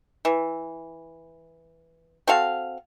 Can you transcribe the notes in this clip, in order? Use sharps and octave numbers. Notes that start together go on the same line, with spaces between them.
E3
C4 F#4 A4 F5